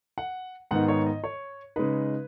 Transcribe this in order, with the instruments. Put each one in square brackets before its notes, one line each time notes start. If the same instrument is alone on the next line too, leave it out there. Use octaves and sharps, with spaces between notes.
[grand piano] F#5
G#2 D#3 B3 D#4 F#5
C#5
D#5
C#5
C#3 G#3 D#4 B4